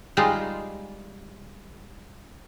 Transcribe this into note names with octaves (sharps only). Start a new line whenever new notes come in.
G3 G#3 D#4 F4 G#4